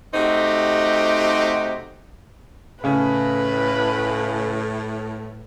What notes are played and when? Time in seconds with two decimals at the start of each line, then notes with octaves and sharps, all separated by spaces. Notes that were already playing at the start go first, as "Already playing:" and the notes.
0.14 C3 A3 C4 D#4 F#4 G4
2.84 A2 C#3 C#4 B4